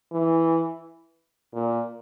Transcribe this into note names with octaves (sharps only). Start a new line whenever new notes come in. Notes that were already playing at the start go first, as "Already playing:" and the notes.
E3
A#2